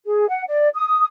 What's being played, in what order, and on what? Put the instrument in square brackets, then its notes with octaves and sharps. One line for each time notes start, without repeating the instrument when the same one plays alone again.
[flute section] G#4
F#5
D5
D#6